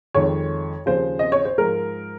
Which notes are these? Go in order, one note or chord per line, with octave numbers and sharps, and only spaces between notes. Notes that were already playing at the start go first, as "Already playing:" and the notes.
F2 D#3 G#3 C#5
D#2 C#3 F3 C5
D#5
C#5
C5
G#2 F3 G#3 A#4